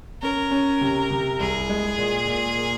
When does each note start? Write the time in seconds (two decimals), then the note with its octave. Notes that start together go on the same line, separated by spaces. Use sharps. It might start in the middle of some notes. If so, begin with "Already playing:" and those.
0.22 C#4 A#4
0.51 C#4
0.81 C3
1.11 C3
1.40 C2 G#4
1.69 G#3
1.98 A#2
2.27 A#2
2.58 A#3